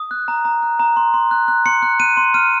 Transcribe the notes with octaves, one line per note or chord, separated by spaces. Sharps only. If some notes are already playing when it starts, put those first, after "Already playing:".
Already playing: D#6
F#6
A#5
A#5
F#6
A#5
C6
C6
F#6
F#6
C6 C#7
F#6
F#6 D#7
C6
F6 D#7